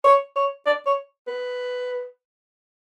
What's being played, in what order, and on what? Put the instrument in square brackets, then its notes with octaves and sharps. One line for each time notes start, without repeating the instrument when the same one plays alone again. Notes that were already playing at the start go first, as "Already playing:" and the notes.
[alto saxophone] C#5
C#5
D5
C#5
B4